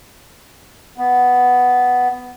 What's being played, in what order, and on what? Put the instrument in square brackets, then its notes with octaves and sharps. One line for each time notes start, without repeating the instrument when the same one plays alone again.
[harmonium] B3